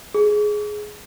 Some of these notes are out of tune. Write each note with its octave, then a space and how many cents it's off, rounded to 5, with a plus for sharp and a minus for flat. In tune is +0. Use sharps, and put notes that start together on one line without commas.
G#4 +10